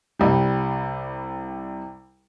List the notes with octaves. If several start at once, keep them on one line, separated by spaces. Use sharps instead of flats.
C2 G3